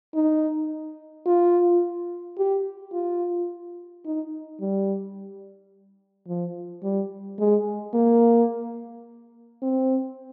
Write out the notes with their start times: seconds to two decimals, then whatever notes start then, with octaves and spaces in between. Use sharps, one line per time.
0.15 D#4
1.26 F4
2.38 G4
2.93 F4
4.05 D#4
4.60 G3
6.28 F3
6.83 G3
7.39 G#3
7.94 A#3
9.62 C4